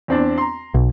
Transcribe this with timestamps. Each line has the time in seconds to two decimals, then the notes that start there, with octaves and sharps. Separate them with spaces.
0.08 E2 C4 D4
0.38 A#5 C6
0.74 B1